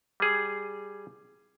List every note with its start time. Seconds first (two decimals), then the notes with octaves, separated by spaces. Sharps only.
0.20 G3 G#4